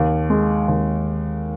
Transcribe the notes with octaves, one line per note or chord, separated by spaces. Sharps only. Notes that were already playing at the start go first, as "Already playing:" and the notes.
Already playing: D#2
G#3
D#2